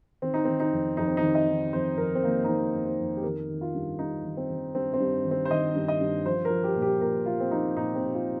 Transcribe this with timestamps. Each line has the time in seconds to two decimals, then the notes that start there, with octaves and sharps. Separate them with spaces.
0.22 D#3 C4
0.34 D#4
0.45 D#3 C4
0.60 D#4
0.72 F2
0.97 F2 D#4
1.07 C4
1.17 D#4
1.23 D#3
1.35 D#5
1.48 D#3
1.73 F2 C5
1.98 F2 A#4
2.15 C4
2.24 D#3 A#3
2.44 D#4
2.48 D#3 C4
2.74 F2
2.86 C5
2.99 F2
3.17 G4
3.23 D#3 A#4
3.49 D#3
3.61 F4
3.75 G2
3.99 G2 D#4
4.24 D#3
4.37 C4
4.50 D#3
4.75 G2 C4
4.94 C4
5.00 G2
5.25 D#3
5.31 C4
5.45 C5
5.50 D#3 D#5
5.75 G2
5.88 D#5
6.01 G2
6.25 F3 C5
6.45 A#4
6.50 F3
6.63 G4
6.76 A#2
6.82 G4
7.01 A#2 A#4
7.26 F3 F4
7.40 C4
7.51 F3 D#4
7.76 A#2 D#4
7.95 C4
8.02 A#2
8.14 F4